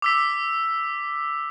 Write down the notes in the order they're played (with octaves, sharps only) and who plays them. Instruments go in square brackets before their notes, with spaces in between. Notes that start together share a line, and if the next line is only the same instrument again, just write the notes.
[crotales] D6 E6 B6